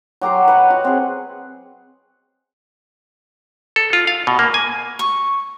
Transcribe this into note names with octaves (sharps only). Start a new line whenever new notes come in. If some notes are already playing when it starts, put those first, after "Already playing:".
F#3 G4 A#5 C6
B4 C#5 D#5 F#5
F#4
C4 G#4
A4
F4
F5
B2
A#3
G#5
C#6